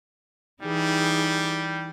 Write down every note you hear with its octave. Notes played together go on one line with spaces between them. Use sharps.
E3 G3 D#4 G#4